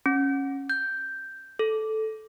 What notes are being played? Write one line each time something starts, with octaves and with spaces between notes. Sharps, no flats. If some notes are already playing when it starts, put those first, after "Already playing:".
C#4
G6
A4